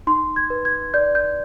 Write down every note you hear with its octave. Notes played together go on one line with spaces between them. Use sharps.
D#4 C6
G#6
B4
G#6
D5 G6
G6